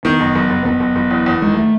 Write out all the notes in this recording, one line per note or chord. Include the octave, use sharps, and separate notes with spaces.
D#3 B3
F#1
F#1
F#1
F#1 B3
F#1
F#1
E2
E2
D#3 G#3
A3